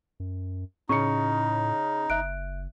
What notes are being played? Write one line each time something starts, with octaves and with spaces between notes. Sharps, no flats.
F#2
A2 C#3 D#4 C#6 C#7
F#1 E5 F#6 D7